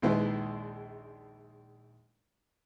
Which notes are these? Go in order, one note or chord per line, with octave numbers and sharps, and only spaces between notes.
A#1 D#2 G#3 E4 B4